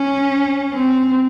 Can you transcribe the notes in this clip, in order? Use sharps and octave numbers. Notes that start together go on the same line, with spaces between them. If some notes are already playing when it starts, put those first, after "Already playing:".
Already playing: C#4
C4